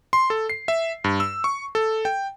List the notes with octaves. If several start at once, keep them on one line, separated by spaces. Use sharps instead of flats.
C6
A4
C7
E5
G2
E6
C#6
A4
G5